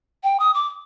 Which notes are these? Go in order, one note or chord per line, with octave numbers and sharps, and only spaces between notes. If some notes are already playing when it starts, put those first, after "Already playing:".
G5
D#6
D6